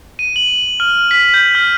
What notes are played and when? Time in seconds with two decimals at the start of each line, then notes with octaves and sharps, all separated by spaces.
0.19 D#7
0.36 F#7
0.80 F6
1.11 B6
1.34 G6
1.55 F6